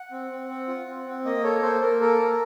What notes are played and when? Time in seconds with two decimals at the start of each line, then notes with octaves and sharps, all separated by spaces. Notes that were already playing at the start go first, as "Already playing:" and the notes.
Already playing: F#5
0.11 C4
0.31 C4
0.49 C4
0.68 F4
0.87 C4
1.06 C4
1.25 A#3 D#5
1.44 A4 C#5
1.62 A#3 C5
1.82 A#3 A#4
2.01 A4 A#4
2.20 A#3